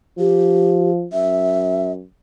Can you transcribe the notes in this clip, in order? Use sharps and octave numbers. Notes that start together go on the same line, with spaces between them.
F3 G4
F#2 E5